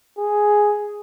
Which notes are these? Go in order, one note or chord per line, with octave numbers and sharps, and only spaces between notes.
G#4